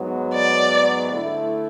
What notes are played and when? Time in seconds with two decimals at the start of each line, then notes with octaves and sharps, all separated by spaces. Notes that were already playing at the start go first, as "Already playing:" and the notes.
Already playing: G#2 F#3 B3
0.34 D5
1.11 D3 A3 E4